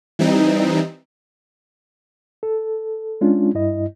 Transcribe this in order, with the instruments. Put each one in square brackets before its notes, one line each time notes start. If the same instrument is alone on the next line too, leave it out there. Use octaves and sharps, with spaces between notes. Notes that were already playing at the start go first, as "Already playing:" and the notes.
[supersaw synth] E3 G3 C4 D#4
[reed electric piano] A4
G#3 C#4 D4 F4
G2 E4 D#5